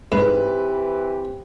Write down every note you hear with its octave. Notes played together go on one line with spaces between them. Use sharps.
G#2 E3 C4 G4 B4